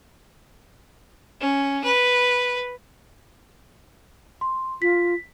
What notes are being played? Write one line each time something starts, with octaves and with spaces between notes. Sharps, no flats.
C#4
B4
C6
F4 B6